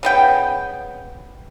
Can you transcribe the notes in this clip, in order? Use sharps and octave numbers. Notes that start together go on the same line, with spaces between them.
C#3 B3 G5